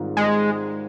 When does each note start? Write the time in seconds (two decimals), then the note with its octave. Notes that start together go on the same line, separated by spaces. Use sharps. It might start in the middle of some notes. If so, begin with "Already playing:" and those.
Already playing: G#2 D#3 G3 C4 F4
0.17 G#3